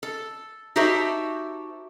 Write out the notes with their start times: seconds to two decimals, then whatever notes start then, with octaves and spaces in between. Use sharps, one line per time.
0.03 A4
0.76 D#4 F#4 G4 A4 C5 E5